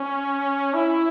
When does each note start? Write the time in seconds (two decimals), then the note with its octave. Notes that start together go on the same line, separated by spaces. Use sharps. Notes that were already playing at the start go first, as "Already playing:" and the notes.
Already playing: C#4
0.74 E4